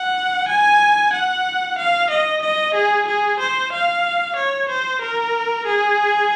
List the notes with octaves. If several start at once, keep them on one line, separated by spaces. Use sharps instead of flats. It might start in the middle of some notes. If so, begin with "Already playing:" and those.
Already playing: F#5
G#5
F#5
F5
D#5
D#5
G#4
G#4
C5
F5
C#5
C5
A#4
G#4